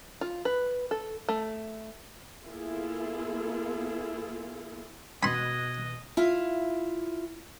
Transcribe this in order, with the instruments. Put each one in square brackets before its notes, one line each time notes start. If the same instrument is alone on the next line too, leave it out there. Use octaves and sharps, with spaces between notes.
[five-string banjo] F4
B4
A4
A3
[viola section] A#3 B3 E4 F4 G#4 A4
[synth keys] B2 F#6 D#7 [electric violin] D#5 [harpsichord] B5 C6 [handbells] G#6
[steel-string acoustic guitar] E4 F4 F5